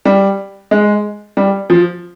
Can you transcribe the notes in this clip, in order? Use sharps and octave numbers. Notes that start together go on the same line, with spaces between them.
G3
G#3
G3
F3